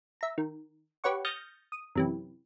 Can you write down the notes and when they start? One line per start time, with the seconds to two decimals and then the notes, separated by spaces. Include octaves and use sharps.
0.21 E5 A#5
0.38 D#3
1.04 G4 B4 C#5 F#5 C#6
1.25 D#6 F6 G6 A6 A#6 C#7
1.72 D#6
1.95 F#2 C3 E3